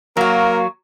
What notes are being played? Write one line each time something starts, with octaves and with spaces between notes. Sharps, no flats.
F#3 A#3 F#4 A#4 F5